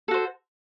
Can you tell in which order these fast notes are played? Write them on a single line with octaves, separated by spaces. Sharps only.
A4 F#4 C5